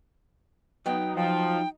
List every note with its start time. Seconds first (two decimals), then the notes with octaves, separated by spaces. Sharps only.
0.86 F#3 B3 D#4 G5
1.16 F3 G5